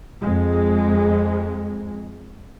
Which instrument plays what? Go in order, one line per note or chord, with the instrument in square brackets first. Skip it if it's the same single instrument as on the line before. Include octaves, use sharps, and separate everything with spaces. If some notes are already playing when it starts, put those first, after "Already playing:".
[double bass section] F2 G#3